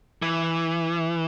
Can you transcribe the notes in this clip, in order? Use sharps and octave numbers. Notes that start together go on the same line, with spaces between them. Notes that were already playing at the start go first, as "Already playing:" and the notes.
E3